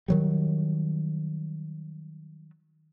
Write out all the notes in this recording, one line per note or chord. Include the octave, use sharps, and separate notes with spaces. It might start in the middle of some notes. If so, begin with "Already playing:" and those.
D#3 F#3 G3